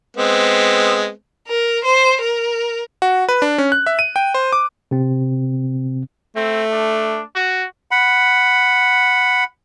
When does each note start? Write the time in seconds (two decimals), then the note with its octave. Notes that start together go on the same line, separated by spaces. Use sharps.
0.17 G#3 B3 C4
1.48 A#4
1.85 C5
2.21 A#4
3.02 F#4
3.29 B4
3.42 D4
3.58 C#4
3.72 F#6
3.86 E5
3.99 D#7
4.16 G5
4.34 C5
4.53 D6
4.91 C3 C4
6.36 A3 C4
6.72 D4
7.35 F#4
7.91 F#5 B5